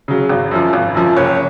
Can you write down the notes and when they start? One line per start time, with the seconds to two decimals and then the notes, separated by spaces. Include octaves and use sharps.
0.08 C#3 F#3
0.29 G#1
0.51 F#2 F3
0.73 G#1
0.95 F#2 F3
1.16 F#1 C#5